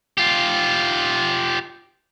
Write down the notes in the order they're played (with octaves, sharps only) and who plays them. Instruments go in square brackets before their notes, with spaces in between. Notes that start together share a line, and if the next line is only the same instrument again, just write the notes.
[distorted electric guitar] F4 G4